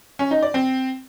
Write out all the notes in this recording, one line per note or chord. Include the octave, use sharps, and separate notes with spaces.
C#4
D#4
D5
C4